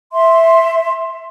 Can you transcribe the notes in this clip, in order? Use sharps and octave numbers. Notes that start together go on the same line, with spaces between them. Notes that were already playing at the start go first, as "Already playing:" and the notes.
E5 C6